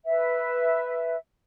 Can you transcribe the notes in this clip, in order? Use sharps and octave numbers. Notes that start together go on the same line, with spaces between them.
B4 E5